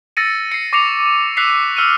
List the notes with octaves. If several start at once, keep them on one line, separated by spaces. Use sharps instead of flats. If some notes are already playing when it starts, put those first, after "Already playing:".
E6 A6 A#6 C#7 D#7
C7 C#7
C#6 D6 A#6 C7 C#7 F7
E6 F#6 B6 C7 F7
E6 F6 C#7 D#7